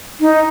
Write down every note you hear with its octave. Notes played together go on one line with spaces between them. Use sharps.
D#4